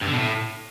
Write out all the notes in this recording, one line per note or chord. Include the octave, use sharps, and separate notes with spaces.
G2
D3
B2
A2